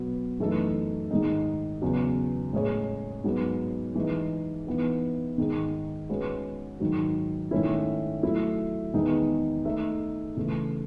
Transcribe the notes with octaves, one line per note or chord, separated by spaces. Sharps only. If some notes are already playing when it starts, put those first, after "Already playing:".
Already playing: B2 F#3 B3 F#4
F#2 E3 A3 D#4 A4
G#2 D#3 G#3 D#4
E2 C#3 F#3 B3
A2 G#3 C#4 G#4 C#5
G#2 F#3 B3 D#4
E3 G#3 D#4
E3 B3 D#4
G#2 D#3 G#3 D#4
G#3 C#4 F#4 B4
G#2 D#3 F#3
G#2 D#3 A3 C#4 E4
F#3 A3 E4
E2 D#3 G#3 B3 D#4
A3 D#4 A4 E5
C#3 E3 A3